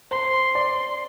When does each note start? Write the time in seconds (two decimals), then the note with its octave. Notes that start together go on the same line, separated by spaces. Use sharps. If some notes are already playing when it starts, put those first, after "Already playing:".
0.11 C5 C6
0.55 D5